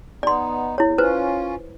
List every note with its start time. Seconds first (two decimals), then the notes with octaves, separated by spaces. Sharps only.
0.23 B3 D#4 D5 C6
0.78 E2 E4 C#5
0.98 C#4 F4 B4 C5